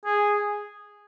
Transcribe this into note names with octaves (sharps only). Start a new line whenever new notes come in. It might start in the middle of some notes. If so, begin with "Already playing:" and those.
G#4